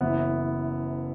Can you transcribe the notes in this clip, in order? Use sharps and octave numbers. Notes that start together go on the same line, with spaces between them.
F#1 F#2 E3 B3